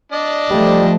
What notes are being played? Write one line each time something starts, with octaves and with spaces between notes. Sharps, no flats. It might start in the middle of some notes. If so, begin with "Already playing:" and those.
D4 D5 D#5
F3 G3 A3